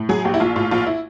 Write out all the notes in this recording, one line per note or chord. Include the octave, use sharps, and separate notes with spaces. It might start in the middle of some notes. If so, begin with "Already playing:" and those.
Already playing: A2
F#3 G#4
A#1 G4
E4
A#1 F4
A2 F4
A#1 F4
E4